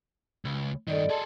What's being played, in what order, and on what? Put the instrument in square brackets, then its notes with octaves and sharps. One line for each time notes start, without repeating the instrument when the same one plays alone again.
[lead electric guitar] C#2
[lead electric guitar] G2 D#3 [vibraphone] A4 D5 D#5
[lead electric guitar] G#4 A4 [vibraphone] A5 C6